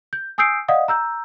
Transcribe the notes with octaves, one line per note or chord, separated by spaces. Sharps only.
G6
G#5 D#6 E6 G6 C7 D7
D5 D#5 F5 F#5 D#6
A#5 E6 G6